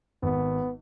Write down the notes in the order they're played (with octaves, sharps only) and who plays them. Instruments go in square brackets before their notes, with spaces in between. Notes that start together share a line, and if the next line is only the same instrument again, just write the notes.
[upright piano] G#1 [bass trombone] B3